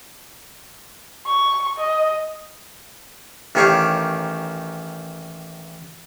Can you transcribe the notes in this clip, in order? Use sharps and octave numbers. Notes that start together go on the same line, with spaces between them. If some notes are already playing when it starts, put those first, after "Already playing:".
C#6
D#5
A1 D#3 G4 C#5 F5 D6